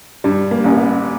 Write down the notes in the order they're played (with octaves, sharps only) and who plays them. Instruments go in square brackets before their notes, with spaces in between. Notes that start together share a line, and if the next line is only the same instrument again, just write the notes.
[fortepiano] G2 [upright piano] G3
[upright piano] A#3
[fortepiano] A1
[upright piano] A#3
B3